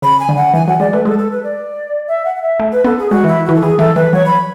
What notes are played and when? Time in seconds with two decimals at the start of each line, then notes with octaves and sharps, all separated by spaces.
0.02 C#3 B5
0.20 G#5
0.29 D3
0.37 F#5
0.54 E3 G#5
0.67 F#3 F#5
0.80 G#3 D5
0.92 A3 B4
1.05 G#3 A4
1.19 A4
1.31 B4
1.44 D5
2.08 E5
2.25 F#5
2.36 F#5
2.42 E5
2.60 A3
2.72 B4
2.84 B3 A4
2.98 G#4
3.10 G#3 F#4
3.24 E3 E4
3.45 E3 F#4
3.55 A4
3.61 E3 G#4
3.79 E3 A4
3.96 E3 B4
4.13 F#3 C#5
4.26 B5